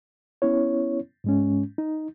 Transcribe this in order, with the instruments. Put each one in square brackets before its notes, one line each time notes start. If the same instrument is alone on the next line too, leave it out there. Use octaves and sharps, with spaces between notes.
[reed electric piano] B3 C#4 E4 C#5
G#2 G#3 C#4
D#4